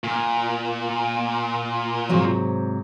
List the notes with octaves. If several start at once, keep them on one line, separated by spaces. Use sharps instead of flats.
A#2
G#2 C3 F#3